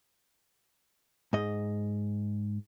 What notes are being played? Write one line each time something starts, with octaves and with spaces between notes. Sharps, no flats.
G#2 D#5